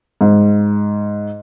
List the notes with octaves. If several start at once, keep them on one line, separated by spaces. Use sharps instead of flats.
G#2